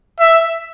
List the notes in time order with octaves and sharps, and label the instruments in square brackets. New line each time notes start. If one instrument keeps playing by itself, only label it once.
[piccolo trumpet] E5